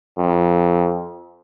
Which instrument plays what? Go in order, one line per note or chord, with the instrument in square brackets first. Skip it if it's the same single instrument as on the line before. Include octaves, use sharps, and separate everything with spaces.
[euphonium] F2